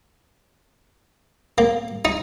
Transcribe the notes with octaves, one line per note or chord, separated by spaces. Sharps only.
A#3
D#4